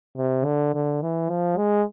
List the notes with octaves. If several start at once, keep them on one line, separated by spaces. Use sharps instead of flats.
C3
D3
D3
E3
F3
G#3